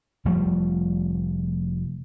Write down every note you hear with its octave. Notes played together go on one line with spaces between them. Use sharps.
F1 F3 G3 A3